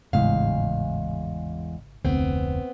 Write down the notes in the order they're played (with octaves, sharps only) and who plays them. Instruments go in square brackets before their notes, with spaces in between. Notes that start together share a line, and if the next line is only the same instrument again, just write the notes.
[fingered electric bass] G#1 A2 C#3 [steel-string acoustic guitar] E2 G#3 F5
[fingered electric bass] F1 D2 [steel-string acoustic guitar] B3 C4